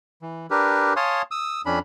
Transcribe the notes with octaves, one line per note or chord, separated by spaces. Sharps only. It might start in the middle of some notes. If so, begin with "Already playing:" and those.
E3
D4 G4 A#4 B4
C#5 F5 G#5 A5 C6 D#6
D#6 E6
F2 C#4 D4 B5